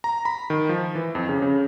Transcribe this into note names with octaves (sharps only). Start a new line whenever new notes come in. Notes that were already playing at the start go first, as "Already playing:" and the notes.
A#5
B5
D#3
F3
E3
F2
C#3
C#3